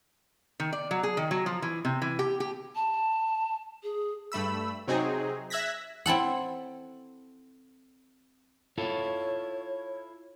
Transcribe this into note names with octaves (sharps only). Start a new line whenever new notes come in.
D#3
D5
F#3
G#4
D#3
F#3
F3
E3
C3
E3
G4
G4
A5
G#4
G2 A3 B5 E6
C3 F#3 C4 D#4 G#4
E5 E6 F#6 G#6 A#6 B6
C4 E4 A4 F#5
E4 F4 A4 C#5